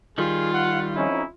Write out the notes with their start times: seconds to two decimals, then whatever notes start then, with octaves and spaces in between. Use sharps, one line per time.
0.18 D#3 G3 F4 G#4
0.54 F#5
0.95 F2 C#4 D#4 E4